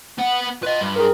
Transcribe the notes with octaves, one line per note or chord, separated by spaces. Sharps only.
B3 F#5
F4 B4 D#5
G2
G#4 A#4